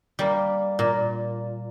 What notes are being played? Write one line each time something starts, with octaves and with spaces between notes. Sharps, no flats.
G3 A#3
A#2